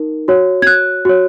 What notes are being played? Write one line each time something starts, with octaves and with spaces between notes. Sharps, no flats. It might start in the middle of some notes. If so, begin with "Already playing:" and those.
Already playing: D#4 A#4
F#4 C#5
G#6
F#6
F#4 C#5